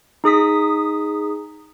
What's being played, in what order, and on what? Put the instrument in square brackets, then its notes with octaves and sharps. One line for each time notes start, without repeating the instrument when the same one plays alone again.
[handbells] D#4 G#4 D#6 B6